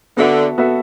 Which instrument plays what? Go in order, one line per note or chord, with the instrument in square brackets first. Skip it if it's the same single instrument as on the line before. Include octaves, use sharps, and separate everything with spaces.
[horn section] D3 [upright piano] B3 F#4 A4 E5
[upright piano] B3 F#4 A4 E5